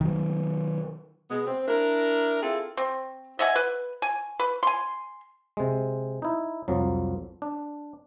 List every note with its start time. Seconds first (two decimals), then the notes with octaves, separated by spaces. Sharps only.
0.01 D#3 F#3
1.30 B2 G#3 B3
1.47 C4
1.68 D4 E4 A#4
2.43 C4 E4 F4 G#4 A4
2.77 C4
3.39 D#5 E5 F#5 G#5
3.55 B4
4.02 G#5
4.39 B4
4.63 G#5 C6
5.57 C3 G#3
6.22 D#4 E4
6.68 C2 F2 F3 F#3
7.42 D4